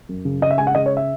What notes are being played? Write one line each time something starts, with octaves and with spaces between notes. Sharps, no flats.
F#2
C#3
C#3 D#5
E5
G#3 G#5
F#5
C#3 D#5
C#5
E5